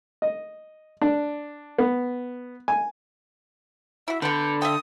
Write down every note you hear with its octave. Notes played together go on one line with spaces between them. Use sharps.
D#5
D4
B3
G#5
E4 F#4 E5
D3 B3 B4 G6
E5 F5 G5 D#6